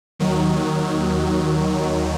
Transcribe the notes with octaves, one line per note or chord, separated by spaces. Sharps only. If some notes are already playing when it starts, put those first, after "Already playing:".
D#2 D#3 F#3